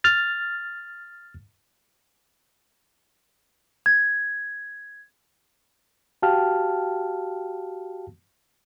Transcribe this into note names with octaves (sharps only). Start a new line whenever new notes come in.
F6 A6
G#6
F#4 G4 F5 G5 A5 F6